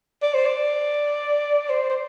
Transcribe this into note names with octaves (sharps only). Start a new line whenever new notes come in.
D5
C5
D5
C5
C5